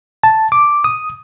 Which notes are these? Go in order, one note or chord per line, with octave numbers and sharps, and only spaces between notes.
A5
D6
D#6